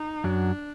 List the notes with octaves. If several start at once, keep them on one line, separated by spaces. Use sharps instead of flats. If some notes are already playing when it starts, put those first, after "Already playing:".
Already playing: D#4
F#2 F#3 D4